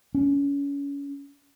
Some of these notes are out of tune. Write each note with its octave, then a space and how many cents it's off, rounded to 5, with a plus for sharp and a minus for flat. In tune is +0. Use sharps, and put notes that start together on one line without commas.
C#4 +30